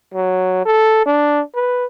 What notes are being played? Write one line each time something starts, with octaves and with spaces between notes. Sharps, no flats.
F#3
A4
D4
B4